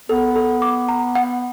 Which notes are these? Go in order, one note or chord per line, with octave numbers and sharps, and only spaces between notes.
B3 A4
A4
D6
A#5
F#5